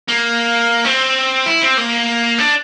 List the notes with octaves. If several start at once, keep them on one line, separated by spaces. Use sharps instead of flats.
A#3
C4
E4
C4
A#3
D4